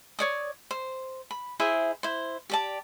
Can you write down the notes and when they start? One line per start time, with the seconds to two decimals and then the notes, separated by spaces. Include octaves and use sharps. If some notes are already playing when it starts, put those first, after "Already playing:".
0.19 C#5 D5 D#6
0.71 C5
1.31 B5
1.60 E4 G#4 C5 E5
2.03 E4 C5
2.50 G4 D5 A5